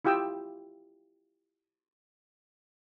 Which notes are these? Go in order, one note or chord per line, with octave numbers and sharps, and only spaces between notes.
E4 F4 G4 G5 D#6 E6